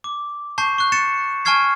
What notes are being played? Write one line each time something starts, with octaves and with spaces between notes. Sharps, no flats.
D6
A5 C#6 G6 C7
C#6 F#6
A6 C#7 E7
G#5 A5 C#6 F6 G#6 C7